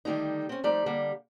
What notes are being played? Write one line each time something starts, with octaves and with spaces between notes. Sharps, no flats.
D3 D#3 G3 A3 D#4
C4 C#4
F3 G3 A3 D#4 D5
D3 G3 A#3 D4